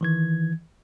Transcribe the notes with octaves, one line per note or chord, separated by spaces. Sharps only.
D#3 E3 G#6